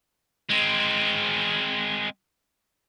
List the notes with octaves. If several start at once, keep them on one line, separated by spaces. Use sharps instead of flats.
G#3 C4